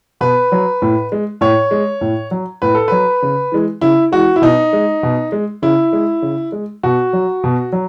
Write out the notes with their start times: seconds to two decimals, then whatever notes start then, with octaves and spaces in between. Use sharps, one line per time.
0.21 B2 B4
0.52 F#3
0.82 A2
1.12 G#3
1.41 A2 C#5
1.71 G#3
2.01 A2
2.31 F#3
2.62 A2 B4
2.75 A4
2.88 F#3 B4
3.22 C#3
3.52 E3 G#3
3.81 C#3 E4
4.12 E3 G#3 F#4
4.36 E4
4.42 B2 D#4
4.73 G#3
5.03 B2
5.32 G#3
5.62 C#3 E4
5.93 G#3
6.22 C#3
6.52 G#3
6.83 B2 F#4
7.13 F#3
7.44 B2
7.72 F#3